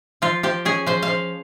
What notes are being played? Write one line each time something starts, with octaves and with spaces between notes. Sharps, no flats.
F3 F4
F3 G4
C#4 G#4
F3 C5
F5
F3